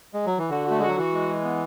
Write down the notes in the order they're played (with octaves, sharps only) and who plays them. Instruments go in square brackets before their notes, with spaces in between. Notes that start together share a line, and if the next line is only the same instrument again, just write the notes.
[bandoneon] G#3
F#3
E3
[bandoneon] D3 [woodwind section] F#4
[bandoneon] A3 [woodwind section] F#4
[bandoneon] G#3 [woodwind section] F#4
[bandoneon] F#3
[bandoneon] E3 [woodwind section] F#4
[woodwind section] G#3
G#3
B3